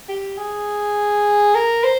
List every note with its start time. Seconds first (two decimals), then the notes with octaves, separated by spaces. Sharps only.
0.09 G4
0.38 G#4
1.55 A#4
1.84 C5